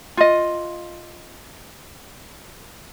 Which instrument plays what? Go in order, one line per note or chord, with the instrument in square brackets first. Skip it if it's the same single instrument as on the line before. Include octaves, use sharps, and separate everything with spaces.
[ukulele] F4 D#5